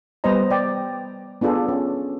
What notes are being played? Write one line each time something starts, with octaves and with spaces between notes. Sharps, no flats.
G3 B3 B4 C5 D#5 A#5
D5 G5
B3 D4 F4 G#4 A4
C#4